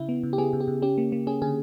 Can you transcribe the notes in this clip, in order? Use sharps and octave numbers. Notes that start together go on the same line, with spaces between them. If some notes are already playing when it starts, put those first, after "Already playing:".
Already playing: C#3 E4
B3
C#3
G4
B3 G#4
C#3
G4
C#3
C#4 G4
A#3
A#3
C#4 G#4
D3 G#4